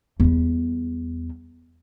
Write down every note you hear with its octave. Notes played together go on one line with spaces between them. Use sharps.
E2 G3